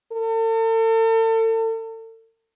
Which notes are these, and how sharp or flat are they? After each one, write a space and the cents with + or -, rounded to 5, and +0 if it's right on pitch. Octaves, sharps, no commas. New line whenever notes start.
A4 +40